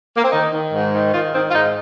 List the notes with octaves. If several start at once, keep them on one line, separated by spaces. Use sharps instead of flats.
A#3
C4
D#3 D#4
D#3
G#2
D#3
D#3 F4
D#3 C4
F4
G#2 D#4